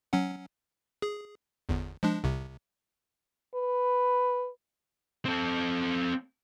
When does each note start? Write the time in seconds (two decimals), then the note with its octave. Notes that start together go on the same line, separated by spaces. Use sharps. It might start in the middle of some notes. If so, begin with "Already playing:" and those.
0.13 F#3 C#4 F#5
1.02 G#4
1.69 G1 E2
2.03 F3 G#3 D4
2.24 C2 C3
3.55 B4
5.26 C4 A4